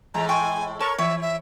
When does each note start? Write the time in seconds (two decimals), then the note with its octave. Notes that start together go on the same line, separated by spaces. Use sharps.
0.14 A2 E3 G#3 A#5
0.29 G5 G#5 C6 C#6
0.80 A4 A#4 C#5 A5 C#6
0.98 E3 C#5 E5
1.22 E5